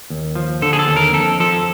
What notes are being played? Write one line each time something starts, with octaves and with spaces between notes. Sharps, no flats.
D#2
F3
D3 A4
G#4
A4
D#2
A#4
F2 A4
F3 A4